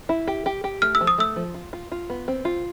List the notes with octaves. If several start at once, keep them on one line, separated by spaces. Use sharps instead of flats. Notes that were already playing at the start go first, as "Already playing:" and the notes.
E4
G4
G4
G4
A3 F6
E6
F3
D#6
A3 E6
F3
F4
F4
F4
B3
C4
F4